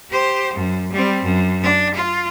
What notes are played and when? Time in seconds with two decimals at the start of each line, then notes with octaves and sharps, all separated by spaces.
0.11 G4 C5
0.53 F#2
0.93 G3 C4
1.24 F#2
1.63 D4
1.95 F4